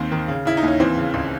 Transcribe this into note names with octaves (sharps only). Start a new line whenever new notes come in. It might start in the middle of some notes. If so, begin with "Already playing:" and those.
Already playing: D#2 D#3 C4
D#3
C#3
C#3 E4
D#4
D#2
C#4
E3 C4
C#3
C#2